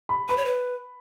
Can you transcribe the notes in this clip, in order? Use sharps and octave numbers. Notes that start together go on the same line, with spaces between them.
B5
B4 B5
C#5
B4